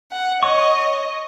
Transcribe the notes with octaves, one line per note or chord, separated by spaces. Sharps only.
F#5
C#5 D#5 C#6